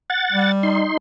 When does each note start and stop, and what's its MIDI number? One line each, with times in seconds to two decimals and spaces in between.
0.10 0.52 78
0.10 0.52 93
0.33 0.89 55
0.63 0.97 63
0.63 0.97 84